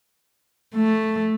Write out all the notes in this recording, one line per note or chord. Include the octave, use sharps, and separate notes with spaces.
A3